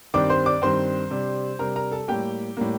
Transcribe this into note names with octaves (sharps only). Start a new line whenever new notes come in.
G2 D#3 G3 C4 D5 D6
C5 C6
D5 D6
G2 D#3 G3 C4 C5 C6
C3 G3 D4
C3 G3 D4 A#4 A#5
A#4 A#5
A4 A5
A2 G3 A#3 G4 G5
A2 G3 A#3